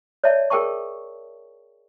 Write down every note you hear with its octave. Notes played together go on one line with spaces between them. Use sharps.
C#5 D5 E5 A5
G#4 A#4 G5 A5 C#6